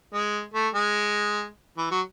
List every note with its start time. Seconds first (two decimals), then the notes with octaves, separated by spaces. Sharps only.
0.13 G#3
0.54 A3
0.75 G#3
1.77 E3
1.91 F#3